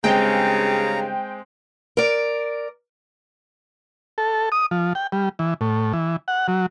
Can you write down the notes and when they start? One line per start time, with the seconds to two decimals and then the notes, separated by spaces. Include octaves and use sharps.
0.04 G2 C#3 G#3 C4 G5 A#5
1.97 A#4 D5
4.18 A4
4.52 D#6
4.71 F3
4.95 G5
5.12 G3
5.39 E3
5.61 A2
5.93 E3
6.28 F#5
6.48 F#3